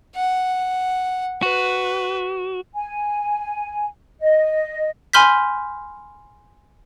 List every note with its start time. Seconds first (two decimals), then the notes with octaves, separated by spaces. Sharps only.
0.15 F#5
1.43 F#4 B4
2.75 G#5
4.20 D#5
5.13 G#5 B5 C6 F6 G6 B6